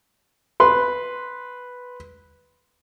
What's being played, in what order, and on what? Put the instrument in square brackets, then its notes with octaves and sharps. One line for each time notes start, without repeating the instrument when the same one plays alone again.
[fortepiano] B4 C6